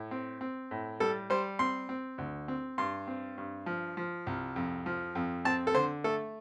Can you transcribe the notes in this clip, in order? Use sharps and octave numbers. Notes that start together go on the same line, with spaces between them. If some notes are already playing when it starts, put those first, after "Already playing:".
Already playing: A2
C4
C4
A2
G3 A4
G3 C5
C4 C6
C4
D2
C4
G2 C6
C4
G2
F3
F3
C2
F2
F3
F2
C4 A5
A4
D3 C5
A3 A4